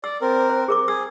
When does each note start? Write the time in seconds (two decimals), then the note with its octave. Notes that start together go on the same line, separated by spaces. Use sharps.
0.04 D5 E6
0.21 C4 A#4
0.50 C5
0.68 G#4 A#4 D6
0.88 G#4 E6